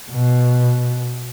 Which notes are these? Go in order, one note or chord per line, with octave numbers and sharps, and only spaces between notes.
B2